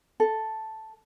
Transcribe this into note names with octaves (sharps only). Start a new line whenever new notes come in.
A4